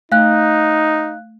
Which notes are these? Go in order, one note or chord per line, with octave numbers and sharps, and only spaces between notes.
A3 D#4 F5 F#6